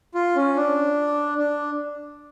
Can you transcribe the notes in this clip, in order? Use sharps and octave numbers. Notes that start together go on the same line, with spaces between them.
F4
C#4
D4
D4